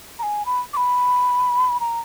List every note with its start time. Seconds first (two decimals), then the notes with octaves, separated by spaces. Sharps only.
0.19 A#5
0.23 G#5
0.46 B5
0.73 D6
0.77 B5
1.80 A#5